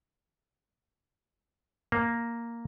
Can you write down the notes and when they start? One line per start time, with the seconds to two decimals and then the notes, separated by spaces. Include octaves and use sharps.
1.92 A#3